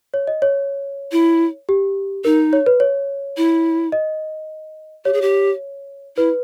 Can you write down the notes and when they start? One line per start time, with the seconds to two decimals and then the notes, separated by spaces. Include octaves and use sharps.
0.14 C#5
0.27 D#5
0.42 C#5
1.12 E4
1.69 G4
2.25 D#4 A#4
2.53 C#5
2.66 B4
2.80 C#5
3.37 E4
3.92 D#5
5.05 G4 C#5
5.13 G#4
5.21 G4
6.17 E4 B4